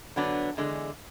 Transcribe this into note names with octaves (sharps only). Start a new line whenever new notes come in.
D3 F#3 B3 D4
E2 D3 G#3